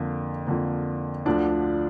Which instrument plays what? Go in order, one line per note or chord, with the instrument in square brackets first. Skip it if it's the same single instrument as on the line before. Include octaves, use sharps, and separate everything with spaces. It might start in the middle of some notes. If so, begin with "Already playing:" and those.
Already playing: [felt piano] F2 D3 A#3 F4 F5
F2 D3 A#3
D2 D3 F3 D4 D5